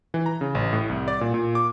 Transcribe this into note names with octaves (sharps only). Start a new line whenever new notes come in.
E3
A#5
C#3
A1
A2
C2
D5
A#2
A#2
D6